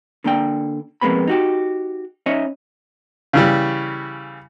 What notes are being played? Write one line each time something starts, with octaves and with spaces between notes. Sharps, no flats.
D3 A#3 D4 G5
F2 C3 G#3 A#3 B3 B5
D#4 F#4 G4
C#4 D#4 C#5 D#5 E5
C#3 E3 G3